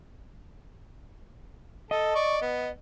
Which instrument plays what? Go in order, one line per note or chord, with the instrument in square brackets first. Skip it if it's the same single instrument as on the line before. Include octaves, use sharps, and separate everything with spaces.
[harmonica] A4 [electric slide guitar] D#5
[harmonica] D5 C#6
B3